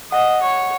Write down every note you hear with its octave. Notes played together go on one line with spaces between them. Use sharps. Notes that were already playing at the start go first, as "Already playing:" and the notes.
D#5 F#5
C#5